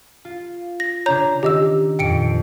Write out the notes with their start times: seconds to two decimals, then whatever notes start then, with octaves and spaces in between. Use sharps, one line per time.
0.25 F4
0.80 A#6
1.06 C#3 D4 C#5 A#5 G6 G#6
1.43 D#3 G4 D#5 E6
1.99 F2 A#2 G5 C#7 D7